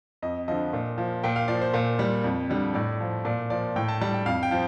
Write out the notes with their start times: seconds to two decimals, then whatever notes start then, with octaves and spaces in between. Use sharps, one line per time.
0.22 F2 D#5
0.48 D3 F3 D#5
0.73 A#2
0.98 F3
1.24 A#2 G5
1.36 F5
1.48 F3 D5
1.61 C5
1.74 A#2
1.99 G3
2.24 F2
2.50 D3 G3
2.74 A2 D5
3.01 F3
3.25 A#2 D5
3.50 F3 D5
3.76 A2 G5
3.88 A5
4.01 G3 A5
4.14 G5
4.26 F2 F5
4.43 G5
4.51 F3